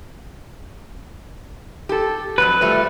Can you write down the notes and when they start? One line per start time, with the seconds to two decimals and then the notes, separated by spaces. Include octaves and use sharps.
1.89 G4 A4
2.38 F2 G#2 F#3 B4
2.61 F3 G3 A3